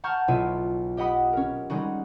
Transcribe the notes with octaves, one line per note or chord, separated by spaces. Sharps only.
F#5 A5 A#5 C#6 F6 G6
B1 B2 F#3 E4 F4 D#7
G4 D#5 F#5 B5 D#6
C#4 A#4
G3 G#3 D#4 F#4